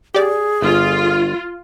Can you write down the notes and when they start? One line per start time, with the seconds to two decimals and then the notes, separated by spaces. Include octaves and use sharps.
0.14 G4 G#4 D5
0.62 G1 F4